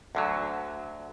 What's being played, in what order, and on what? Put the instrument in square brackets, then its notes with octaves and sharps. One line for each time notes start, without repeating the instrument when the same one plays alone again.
[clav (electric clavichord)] D2 D3 F#3